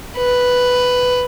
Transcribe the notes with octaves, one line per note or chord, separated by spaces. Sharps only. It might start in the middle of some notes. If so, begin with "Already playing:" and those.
B4